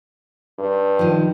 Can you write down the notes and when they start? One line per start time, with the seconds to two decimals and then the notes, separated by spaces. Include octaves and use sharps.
0.59 G2
0.99 D#3 F3